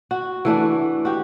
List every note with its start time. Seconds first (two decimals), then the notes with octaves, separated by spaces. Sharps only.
0.11 F#4
0.45 E3 A3 D4 F#4
1.05 F#4 G4